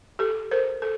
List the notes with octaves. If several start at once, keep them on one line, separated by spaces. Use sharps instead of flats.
G4 A4
A#4 C5
A4